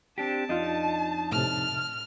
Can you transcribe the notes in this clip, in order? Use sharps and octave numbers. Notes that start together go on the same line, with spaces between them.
C4 D4 G4 A5
F2 D4 D#4 F4 D#5
A2 C3 F6